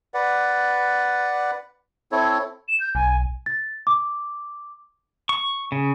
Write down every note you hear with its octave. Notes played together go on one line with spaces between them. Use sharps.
B4 D5 F#5
C4 E4 A4 C#5
E7
G6
B1 G#5
A6
D6
C#6
C#3